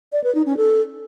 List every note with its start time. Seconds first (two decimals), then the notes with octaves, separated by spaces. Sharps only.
0.13 D5
0.24 B4
0.35 D#4
0.46 C#4
0.57 A4